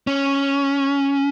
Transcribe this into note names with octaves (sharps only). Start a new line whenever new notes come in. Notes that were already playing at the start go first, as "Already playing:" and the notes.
C#4